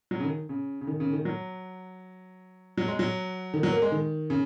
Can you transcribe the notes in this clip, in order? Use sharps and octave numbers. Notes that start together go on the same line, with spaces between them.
F#3
C#3
D#3
C#3
C#3
D#3
C#3
D#3
F#3
F#3
G#3
F#3
D#3
F#3
A#3
G#3
D#3
C#3